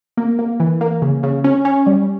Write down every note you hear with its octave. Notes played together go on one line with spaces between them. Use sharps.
A#3
A#3
E3
A#3
C#3
C#3
C#4
C#4
G3